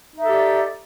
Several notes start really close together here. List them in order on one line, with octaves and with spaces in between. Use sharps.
D#4 E5 A4 G4 D5